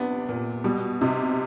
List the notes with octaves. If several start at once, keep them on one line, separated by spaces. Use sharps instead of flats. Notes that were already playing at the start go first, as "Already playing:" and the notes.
Already playing: C3 B3 D4
A#2
B2 G3
C3 D#4